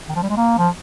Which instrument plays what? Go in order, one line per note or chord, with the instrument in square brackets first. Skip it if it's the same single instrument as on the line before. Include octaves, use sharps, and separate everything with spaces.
[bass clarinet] D#3
F3
G3
G#3
A#3
F3